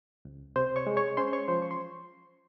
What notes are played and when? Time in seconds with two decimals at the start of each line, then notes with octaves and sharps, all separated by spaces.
0.25 C#2
0.56 C3 C5 C6
0.76 C#5 C#6
0.87 G#3
0.97 C#5 C#6
1.17 C#4 C5 C6
1.33 C#5 C#6
1.48 F3 C5 C6
1.62 C#6
1.71 C6